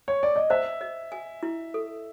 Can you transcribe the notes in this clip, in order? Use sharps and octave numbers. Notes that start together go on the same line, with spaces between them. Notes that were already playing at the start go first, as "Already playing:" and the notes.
C#5
D5
D#5
C5 E5
D#5
G#5
E4
A4